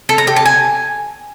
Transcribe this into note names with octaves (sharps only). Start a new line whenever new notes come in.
A4
A#5
G4
A5
G#5